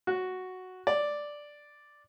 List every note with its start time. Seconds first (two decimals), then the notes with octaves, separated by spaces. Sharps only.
0.07 F#4
0.87 D5